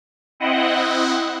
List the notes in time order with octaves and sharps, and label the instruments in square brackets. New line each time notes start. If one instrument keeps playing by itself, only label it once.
[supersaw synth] C4 E4 D#5 F#5